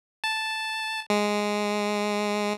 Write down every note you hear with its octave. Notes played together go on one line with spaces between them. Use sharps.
A5
G#3